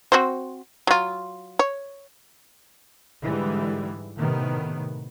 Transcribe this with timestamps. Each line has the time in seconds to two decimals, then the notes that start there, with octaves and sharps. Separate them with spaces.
0.12 C4 F#4 C5
0.87 F#3 F4
1.59 C#5
3.24 G#2 D3 E3 G3 G#3
4.18 A2 C3 D#3 B3